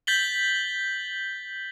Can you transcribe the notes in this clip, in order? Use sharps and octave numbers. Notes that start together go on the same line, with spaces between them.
G6 A6 B6 F#7 G7